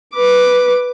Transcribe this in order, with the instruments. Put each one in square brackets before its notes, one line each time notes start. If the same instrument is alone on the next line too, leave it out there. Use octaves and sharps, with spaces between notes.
[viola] B4 D6